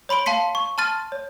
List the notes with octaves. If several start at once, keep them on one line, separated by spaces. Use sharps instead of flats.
C#5 B5 C6 D7 G7
F5 A5 C6 B6 C#7
C#6
A5 C6 F6 A6 D#7
C#5